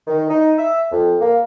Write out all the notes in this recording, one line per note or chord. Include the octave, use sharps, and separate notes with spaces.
D#3
D#4
E5
F2
A#3